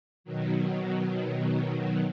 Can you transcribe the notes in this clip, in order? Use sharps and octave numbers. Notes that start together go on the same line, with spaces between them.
B2 D#3 F#3